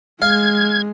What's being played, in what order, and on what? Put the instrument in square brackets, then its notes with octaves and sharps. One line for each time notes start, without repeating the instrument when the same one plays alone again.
[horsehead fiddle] G#3 [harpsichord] F5 [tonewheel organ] G#6